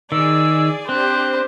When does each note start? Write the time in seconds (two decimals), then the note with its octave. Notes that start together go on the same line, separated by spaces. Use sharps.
0.12 D#3 G#4 D5 E6
0.89 C4 D4 G4 C5 F#6